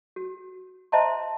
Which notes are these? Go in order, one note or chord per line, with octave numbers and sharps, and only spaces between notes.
F#4
C5 D#5 E5 A5 A#5 C6